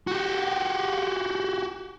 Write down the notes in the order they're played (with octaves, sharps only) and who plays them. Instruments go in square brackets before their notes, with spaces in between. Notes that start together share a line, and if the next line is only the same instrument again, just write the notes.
[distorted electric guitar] F#4 G4